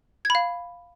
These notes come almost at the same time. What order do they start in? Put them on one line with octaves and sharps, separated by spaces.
G#6 B5 F5